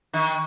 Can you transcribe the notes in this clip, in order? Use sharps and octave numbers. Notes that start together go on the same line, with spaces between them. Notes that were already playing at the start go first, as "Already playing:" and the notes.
D#3